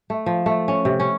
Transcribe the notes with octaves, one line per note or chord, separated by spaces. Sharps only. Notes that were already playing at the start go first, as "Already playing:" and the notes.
A3
F3
A3
C#4
C3
C#4